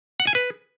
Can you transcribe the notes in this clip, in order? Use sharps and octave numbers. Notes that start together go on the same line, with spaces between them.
F#5
G#5
B4